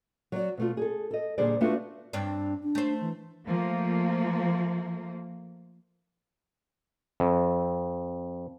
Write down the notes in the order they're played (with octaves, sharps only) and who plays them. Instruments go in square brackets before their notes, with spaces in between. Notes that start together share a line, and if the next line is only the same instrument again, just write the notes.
[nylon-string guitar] F#3 D5
B2 A3 F4
G#4 A4
A4 D#5
A#2 D3 G3 G#4 C5 D5
A3 B3 D4 F4 F#4 A4
[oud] G2 C4 D4
[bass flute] D4
[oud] A3 C5
[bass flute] E3
[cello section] F3 A3 A#3
[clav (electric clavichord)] F2